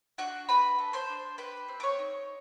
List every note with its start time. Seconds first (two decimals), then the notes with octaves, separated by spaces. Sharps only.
0.18 D4 F#4 F#5
0.49 F#4 B4 B5
0.79 A4
0.93 C5 C6
1.09 D4
1.38 G4 B4 B5
1.68 C4
1.80 D6
1.83 C#5 C#6
1.99 D#4